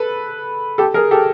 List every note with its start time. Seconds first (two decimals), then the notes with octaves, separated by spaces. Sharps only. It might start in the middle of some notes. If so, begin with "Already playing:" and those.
Already playing: A4 B4
0.78 G4 A4
0.94 G#4 A#4
1.11 G4 A4